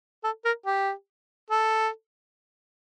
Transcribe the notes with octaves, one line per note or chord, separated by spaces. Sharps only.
A4
A#4
G4
A4